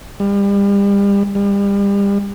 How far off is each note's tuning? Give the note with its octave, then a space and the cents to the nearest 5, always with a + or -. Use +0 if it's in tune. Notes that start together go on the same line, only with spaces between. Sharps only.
G3 +35
G3 +35